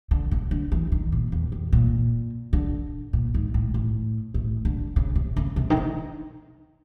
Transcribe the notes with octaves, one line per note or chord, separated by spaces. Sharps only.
D3
C#3
D3
E3
D#3
A#2
E2
F2
A#2
D3
A#2
G#2
A2
A2
A2
D3
C#3
C3
C#3
C3
D#3
D3